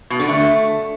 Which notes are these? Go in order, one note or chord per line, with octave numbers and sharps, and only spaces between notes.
B2
D3
A3